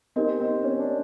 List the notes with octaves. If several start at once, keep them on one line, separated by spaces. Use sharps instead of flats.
C4 D#4 G4 A#4 D#5
C4
C#4
D4